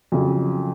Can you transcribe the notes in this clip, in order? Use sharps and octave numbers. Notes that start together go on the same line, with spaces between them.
F2 C#3 F#3